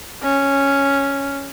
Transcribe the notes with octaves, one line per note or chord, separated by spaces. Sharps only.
C#4